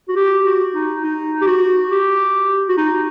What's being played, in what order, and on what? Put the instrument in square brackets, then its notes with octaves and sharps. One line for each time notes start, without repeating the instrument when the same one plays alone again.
[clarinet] F#4
G4
F#4
D#4
D#4
G4
F#4
G4
F#4
D#4